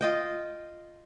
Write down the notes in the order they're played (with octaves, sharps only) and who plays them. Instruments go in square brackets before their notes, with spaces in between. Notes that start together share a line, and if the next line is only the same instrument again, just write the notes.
[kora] F4 D#5 G5